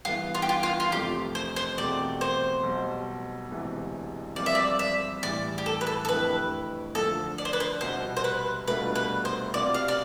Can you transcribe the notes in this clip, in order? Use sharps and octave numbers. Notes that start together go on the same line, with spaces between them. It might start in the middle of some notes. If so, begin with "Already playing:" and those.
G2 E3 B3 F4
F4
G4
F4
F4
F4
F2 C3 F3 A3 G4
C5
C5
E2 B2 A3 C4 G4 D5
C5
B1 B2 G3
E1 D2 C3 E3
G2 F3 C4 F4 C5 D5
E5
D5
E5
A2 E3 G3 D5
G4
A4
B4
A4
A4
F2 D3 A3 E4 G4 B4
D2 D3 F3 A4
D5
C5
B4
C5
C2 B2 G3 B3 C5
C5
B4
C2 B2 A3 D4 F4 B4
B4
C5
C2 B2 G3 C4 F4 D5
F5
D5